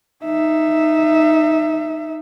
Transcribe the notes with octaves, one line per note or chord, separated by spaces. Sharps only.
D#4 E5